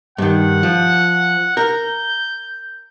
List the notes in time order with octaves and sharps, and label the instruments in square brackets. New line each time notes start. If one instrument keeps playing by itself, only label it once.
[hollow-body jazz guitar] G2 D#3 [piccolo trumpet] F#5
[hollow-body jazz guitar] F3
[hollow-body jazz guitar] A#4 [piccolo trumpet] G6